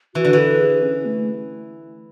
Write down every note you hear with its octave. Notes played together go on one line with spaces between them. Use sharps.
E3 F#4
D3
E3 A4
G#4
C#4
A3